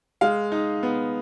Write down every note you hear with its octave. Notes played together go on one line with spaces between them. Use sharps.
G#3 F5
D#4
B3